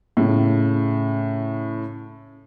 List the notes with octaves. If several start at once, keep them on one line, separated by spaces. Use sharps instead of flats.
A2 C#3